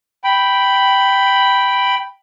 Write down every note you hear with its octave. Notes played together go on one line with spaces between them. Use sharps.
G5 B5